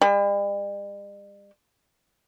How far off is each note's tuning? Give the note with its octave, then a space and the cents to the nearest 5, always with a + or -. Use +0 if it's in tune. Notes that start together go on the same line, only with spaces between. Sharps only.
G3 +45